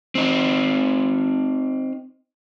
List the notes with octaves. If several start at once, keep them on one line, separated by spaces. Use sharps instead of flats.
C4 D#4